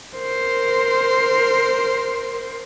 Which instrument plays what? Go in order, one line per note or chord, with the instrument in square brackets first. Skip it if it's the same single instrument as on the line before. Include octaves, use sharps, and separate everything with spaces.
[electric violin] A#4 C5